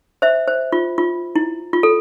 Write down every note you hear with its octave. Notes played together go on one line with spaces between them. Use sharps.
C5 E5
C5
F4
F4
E4
F4
A4